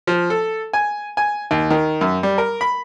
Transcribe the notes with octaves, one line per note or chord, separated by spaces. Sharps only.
F3
A4
G#5
G#5
D#2
D#3
F#2
G3
A#4
B5